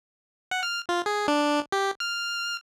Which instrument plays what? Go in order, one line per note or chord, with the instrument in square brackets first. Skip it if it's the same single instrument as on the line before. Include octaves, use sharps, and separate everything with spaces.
[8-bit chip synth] F#5
F6
F4
G#4
D4
G4
F6